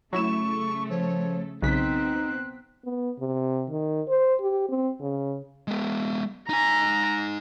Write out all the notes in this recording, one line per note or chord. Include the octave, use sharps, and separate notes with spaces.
C#3 F#3 A3 E4 A4 C#6 E7
F3 C#5
B1 C#3 B3 C4 D#4 F#6 B6
B3
C3
D#3
C5
G4
C4
C#3
G#3 B3
D#4 G#5 A#5